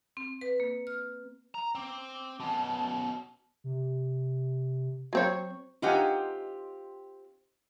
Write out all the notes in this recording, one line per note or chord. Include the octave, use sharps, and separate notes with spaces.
C4
B4
A#3
F6
A#5
C4 D6
B2 C#4 A5
C3
F#3 C4 C#5 C#6
C4 D#4 F4 G4 F#5 G#5